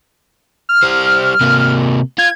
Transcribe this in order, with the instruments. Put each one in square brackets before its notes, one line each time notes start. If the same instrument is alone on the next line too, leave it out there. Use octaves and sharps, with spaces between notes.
[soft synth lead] F6
[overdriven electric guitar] G3 C5
C3 A#3
[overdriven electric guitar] F4 [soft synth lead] G#6